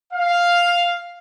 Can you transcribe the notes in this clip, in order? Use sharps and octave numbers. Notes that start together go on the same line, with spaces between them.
F5